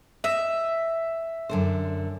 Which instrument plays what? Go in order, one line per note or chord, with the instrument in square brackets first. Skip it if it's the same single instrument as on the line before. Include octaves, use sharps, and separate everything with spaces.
[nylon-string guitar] D#5 [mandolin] E5
[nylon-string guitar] F#2 D3 C5